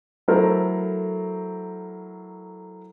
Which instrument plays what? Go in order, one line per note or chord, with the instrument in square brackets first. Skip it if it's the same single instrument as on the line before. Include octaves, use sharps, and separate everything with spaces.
[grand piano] F#3 A3 E4 A4 A#4 C5